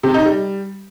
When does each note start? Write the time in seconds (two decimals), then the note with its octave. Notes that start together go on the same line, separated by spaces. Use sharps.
0.03 C3
0.14 D#4
0.25 G3